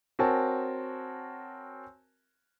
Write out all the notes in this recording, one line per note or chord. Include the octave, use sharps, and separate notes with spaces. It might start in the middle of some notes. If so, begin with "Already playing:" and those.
C4 F#4 A#4 C#5 G#5 A5